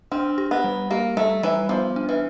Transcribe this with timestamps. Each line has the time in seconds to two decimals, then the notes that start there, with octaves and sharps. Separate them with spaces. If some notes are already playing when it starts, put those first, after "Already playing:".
0.12 C4 D4
0.38 G4
0.51 B3
0.64 G3
0.90 A#3 G4
1.17 G3 A3
1.43 E3 G3
1.69 F3 B3
1.96 D4
2.09 E3